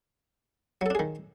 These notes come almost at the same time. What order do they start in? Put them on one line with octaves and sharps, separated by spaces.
F#3 A4 D4 G#4 D#3